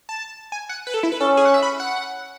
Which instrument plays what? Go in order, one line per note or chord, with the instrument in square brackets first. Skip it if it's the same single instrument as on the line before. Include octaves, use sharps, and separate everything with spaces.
[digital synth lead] A5
G#5
F#5
B4
A4
E4
B4
[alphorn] C#4 [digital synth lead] A4
[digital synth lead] G#4
F#5
E5
B5
F#5